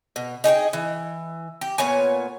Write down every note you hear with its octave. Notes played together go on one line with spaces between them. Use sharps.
B2
D#4 G#4 C#5 G5
E3
G4
A#2 B3 C#5 G#5